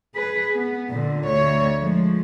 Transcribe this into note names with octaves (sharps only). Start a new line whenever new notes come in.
G#4 B4
B3
A#2 D3
D2 C#5
F3 G#3